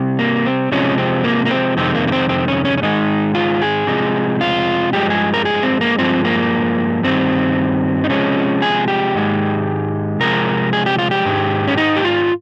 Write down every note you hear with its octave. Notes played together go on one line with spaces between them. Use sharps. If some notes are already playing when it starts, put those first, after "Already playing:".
Already playing: C3 G3
A#3
C4
C3 F3 G#3 C#4
C4
A#3
A#3
C4
F2 C3 D#3 G#3 C4
A#3
A#3
C4
C4
C#4
C#4
C#4
G#2 D#3 G#3 D#4
F4
G#4
C3 F3 G#3
F4
G2 F3 G#3 G4
G#4
A#4
G#4
C4
A#3
G2 F3 G#3 C4
A#3
G2 D#3 G3 C4
D#4
C3 F3 G#3 C#4
G#4
G4
G#2 D#3 G#3
C3 F3 G#3 A#4
G#4
G4
F4
G4
G#2 D#3 G#3
C#4
D#4
G4
F4